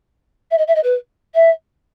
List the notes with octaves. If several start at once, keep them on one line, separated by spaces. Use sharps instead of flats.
E5
D#5
E5
D#5
B4
E5